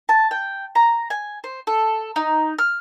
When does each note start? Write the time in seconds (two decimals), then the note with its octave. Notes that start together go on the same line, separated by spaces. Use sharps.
0.09 A5
0.31 G5
0.75 A#5
1.10 G#5
1.44 C5
1.67 A4
2.16 D#4
2.59 F6